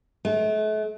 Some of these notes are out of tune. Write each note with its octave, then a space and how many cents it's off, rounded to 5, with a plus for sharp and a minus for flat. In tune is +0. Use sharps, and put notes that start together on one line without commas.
A3 -40